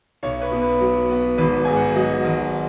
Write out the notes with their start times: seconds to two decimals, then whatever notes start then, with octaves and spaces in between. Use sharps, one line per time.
0.23 B1 C#5
0.41 B4
0.51 B2
0.62 B4
0.81 F#3
1.09 B3
1.38 G#1 B4
1.65 G#2 G#5
1.77 F#5
1.95 F#3 D#5
2.24 G#1